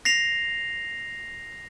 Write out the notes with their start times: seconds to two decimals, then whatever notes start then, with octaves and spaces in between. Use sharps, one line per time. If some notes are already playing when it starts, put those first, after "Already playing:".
0.05 A#6 C7 F7